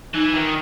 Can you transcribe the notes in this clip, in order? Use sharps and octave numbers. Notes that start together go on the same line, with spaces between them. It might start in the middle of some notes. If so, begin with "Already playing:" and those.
E3 D#4
D#3